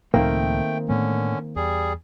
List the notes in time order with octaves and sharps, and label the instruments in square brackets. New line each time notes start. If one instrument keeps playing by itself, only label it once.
[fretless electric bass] C#2 A2 F3 [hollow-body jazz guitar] D#3 A#3 C4 [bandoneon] A3 G5
[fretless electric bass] A2 A3 B3 [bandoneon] D3 C#4
[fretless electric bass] E2 [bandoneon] G3 G#4